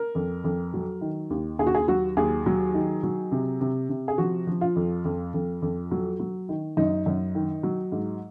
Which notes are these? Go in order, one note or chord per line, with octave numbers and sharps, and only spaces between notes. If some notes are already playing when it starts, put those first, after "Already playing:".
Already playing: A#4
F2
F2
F#3
D#3
D#2
D#2 G#4
F#4
G#4
F#3 F#4
D#2 G#4
F#3
D#3
F#3
C3
C3
C3
G#4
F3 F#4
F3
F4
F2
F2
F2
F2
F#3
F#3
D#3
F#2 D#4
F#2
D#3
F#3
G#2